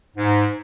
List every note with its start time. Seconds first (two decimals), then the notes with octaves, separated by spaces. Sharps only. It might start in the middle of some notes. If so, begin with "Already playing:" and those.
0.17 G#2